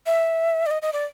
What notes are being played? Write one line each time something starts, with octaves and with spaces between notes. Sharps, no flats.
E5
D5
D#5
D#5
D5